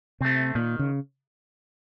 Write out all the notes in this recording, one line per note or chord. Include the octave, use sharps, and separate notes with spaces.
C3 A3 C4
A#2 D#3
C#3